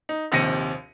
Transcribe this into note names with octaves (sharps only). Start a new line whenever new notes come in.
D#4
A#1 D#2 C3 A#6 C#7 D#7